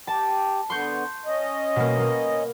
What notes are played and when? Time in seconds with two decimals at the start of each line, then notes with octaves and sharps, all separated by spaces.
0.07 G4 A5
0.70 D3 B3 C6 C#6 G6
1.25 C#4 D#5
1.76 B2 A#3
1.99 A#3